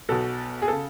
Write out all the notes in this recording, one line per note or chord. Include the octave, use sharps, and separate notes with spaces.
B1 B2 A4
G#4
C#3 A4